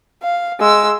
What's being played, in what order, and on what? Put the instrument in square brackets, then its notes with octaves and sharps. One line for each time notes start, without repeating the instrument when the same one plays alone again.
[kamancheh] F5
G#3 E6